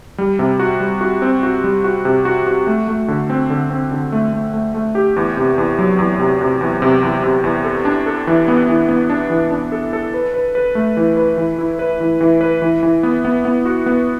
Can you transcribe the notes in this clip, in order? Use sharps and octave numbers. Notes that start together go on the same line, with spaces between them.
G3
C3
F#4
G3
F#4
C4
F#4
G3
F#4
C3
F#4
F#4
A3
A3
D3
C4
D3
C4
D3
A3
A3
A3
A3
G4
E2
C3
E2
F#3
E2
C3
C3
E2
C3
E2
C3
E2
A4
D4
A4
E3
B3
E3
B3
D4
E3
D4
A4
A4
B4
B4
B4
A3
E3
B4
E3
E4
B4
E3
E3
B4
E3
E3
B3
B3
B3
F#4
B3